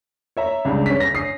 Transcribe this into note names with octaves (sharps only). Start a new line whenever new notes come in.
C#5 E5 A#5
C#2 G3 D4
C#4 B6
C#3 C#4 A#6
C#4 D#6 C7